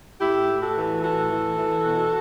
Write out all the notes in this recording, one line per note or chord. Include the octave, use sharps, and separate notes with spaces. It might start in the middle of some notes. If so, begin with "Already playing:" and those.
A2 E4 G4
A2
F#4 A4
E3
A2 F#4 A4
E3
E3
B2